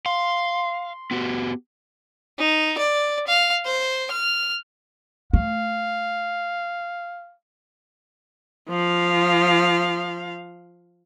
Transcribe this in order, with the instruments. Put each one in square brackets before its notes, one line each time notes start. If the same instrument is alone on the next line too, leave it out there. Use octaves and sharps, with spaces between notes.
[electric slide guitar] F5 [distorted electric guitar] C6
[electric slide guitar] B3 F#4 G4
[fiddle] D#4
D5
F5
C5
F6
[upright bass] A3 [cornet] F5
[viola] F3 F5